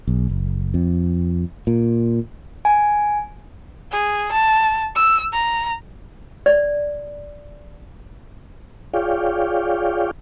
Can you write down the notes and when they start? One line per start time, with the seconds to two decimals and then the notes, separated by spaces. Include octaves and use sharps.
0.08 B1
0.29 F#1
0.74 F2
1.67 A#2
2.65 G#5
3.91 G#4
4.32 A5
4.95 E6
5.33 A#5
6.46 D5
8.94 F4 G#4 C#5 D5 F5 G5